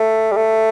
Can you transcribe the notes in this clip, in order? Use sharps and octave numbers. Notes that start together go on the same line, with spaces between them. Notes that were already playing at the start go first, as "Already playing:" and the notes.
Already playing: A3
G3
A3